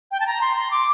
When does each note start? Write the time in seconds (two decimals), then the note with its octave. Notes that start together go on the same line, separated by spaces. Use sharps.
0.11 G5
0.20 A5
0.27 A#5
0.41 C6
0.57 C6
0.71 D6